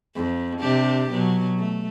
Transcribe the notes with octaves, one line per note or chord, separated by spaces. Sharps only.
F2
C3 D4 G4
B2 F#3
A3